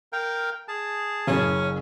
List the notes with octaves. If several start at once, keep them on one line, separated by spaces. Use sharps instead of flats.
A#4 F5 G5
G#4 A5
F#1 C#3 C#4